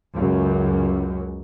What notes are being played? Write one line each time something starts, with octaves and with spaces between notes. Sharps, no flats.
C#2 F#2